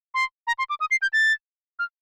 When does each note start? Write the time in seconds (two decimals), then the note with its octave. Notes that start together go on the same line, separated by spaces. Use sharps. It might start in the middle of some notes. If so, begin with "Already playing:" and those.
0.14 C6
0.47 A#5
0.59 C6
0.70 D6
0.80 D#6
0.91 C7
1.02 G6
1.13 A6
1.79 F6